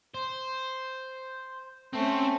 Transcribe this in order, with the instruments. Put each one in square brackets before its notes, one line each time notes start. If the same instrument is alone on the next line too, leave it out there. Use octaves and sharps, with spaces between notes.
[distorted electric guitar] C5
[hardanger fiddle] A3 C#4 [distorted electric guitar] C4